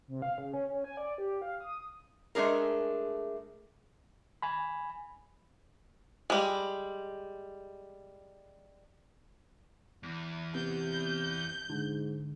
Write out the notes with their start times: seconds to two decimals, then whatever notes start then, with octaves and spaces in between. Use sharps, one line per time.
0.08 C3
0.22 F5
0.38 C#3
0.53 C#4
0.70 C#4
0.84 G#5
0.97 D5
1.18 G4
1.42 F5
1.60 D#6
2.35 G#3 A3 D4 G#4 A#4
4.42 G#5 B5
6.30 G3 G#3
10.03 E2
10.55 C3 B3 G6
11.70 G#2 D3